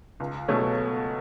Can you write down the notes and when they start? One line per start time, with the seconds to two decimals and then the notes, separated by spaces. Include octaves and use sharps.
0.20 C#2
0.48 B2 F#3 A3 C#4